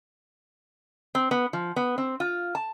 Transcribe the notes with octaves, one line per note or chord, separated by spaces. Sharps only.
C4
B3
F3
B3
C4
F4
A5